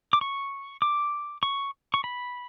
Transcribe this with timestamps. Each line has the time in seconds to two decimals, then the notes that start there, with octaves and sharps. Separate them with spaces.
0.13 D6
0.21 C#6
0.82 D6
1.43 C#6
1.94 C#6
2.04 B5